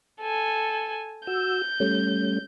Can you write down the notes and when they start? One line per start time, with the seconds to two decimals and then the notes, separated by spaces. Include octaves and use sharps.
0.21 A4 G#5
1.27 F#4 E6 G6
1.80 G3 A3 C#4